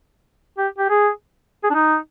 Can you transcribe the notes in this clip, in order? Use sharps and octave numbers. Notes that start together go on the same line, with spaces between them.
G4
G4
G#4
G#4
D4
D#4